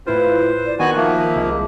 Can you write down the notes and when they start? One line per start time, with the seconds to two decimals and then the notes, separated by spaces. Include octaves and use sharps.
0.07 A2 E4 F4 B4 C5
0.66 D5
0.79 D#3 B3 F#4 G#5 F#6
0.96 F3 A#3 E5
1.35 C2 G#3